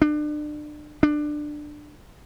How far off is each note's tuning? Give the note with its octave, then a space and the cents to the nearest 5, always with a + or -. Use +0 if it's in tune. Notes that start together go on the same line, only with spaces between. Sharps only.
D4 +35
D4 +20